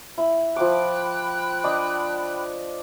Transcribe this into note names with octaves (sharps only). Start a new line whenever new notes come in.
E4
F3 G5 B5 D6 F#6
D4 D5 D#5